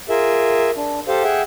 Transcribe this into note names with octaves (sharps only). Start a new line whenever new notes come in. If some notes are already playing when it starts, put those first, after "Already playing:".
F4 G#4 A#4 E5
D4
G4 A4 C5 F5
G#4 E5 F#5 G5